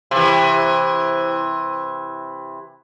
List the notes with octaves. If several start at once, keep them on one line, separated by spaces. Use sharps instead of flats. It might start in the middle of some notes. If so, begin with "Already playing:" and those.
C3 E3